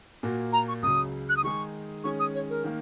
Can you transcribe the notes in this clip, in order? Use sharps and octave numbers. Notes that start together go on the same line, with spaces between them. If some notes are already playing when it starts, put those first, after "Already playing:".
A#2 A#3 F#4
A#5
C#6
C#2 C#3 F#3 D#6
F#6
D#6
D#3 G#3 D#4 G#4 C#6
D#3 G#3 C#4 G#4 C#6
D#6
C#5
A#4
D#3 A#3